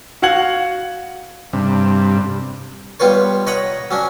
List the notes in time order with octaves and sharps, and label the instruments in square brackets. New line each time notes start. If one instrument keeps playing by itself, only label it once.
[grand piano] F#4 F5 F#5 G#6 F#7
[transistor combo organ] G2 C3
[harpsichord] G3 B3 F4 B4 C#5
C#5 D#5 F#5 A#5 B5 D#6
F#3 C#4 D4